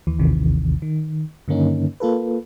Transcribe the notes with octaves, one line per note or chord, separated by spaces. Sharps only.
D#2 E3
A1 D#2 C3 D#3 E3
D#3
G2 D3 D#3 A#3 C#4 D#4
A#3 F4 A4 B4